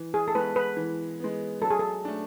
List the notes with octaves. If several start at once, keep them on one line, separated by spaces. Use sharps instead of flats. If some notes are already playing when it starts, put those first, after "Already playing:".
Already playing: E3
G#4
A4
G#3 B3 B4
B4
E3
G#3 B3
F#3 A4
G#4
A4
A3 D4